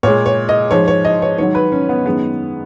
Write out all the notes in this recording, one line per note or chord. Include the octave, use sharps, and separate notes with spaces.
A#2 G#3 C#5
C#5
D#5
G#2 F3 G#3 C#5
C#5
D#5
C#5
G#2 D#3 F#3 C#5
B4
C#4
B3
F#2 D#3 G#3 B3